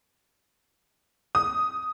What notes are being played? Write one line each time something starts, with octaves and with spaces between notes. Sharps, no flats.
D#6